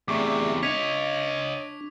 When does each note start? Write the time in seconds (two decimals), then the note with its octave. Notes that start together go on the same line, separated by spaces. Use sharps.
0.08 E2 C3 A3 G#4 D5 C#6 D6
0.63 D4 C#5 D#5 G#6 B6 F7